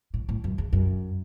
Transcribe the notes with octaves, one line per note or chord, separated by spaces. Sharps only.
A2
A2
F#2
E2
F#2